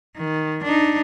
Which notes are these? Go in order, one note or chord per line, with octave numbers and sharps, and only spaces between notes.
D#3
D4 D#4